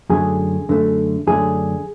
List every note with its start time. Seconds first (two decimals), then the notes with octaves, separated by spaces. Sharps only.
0.10 F#2 D3 A3 G#4
0.69 F#2 D3 A3
1.27 F#2 D3 A3 G#4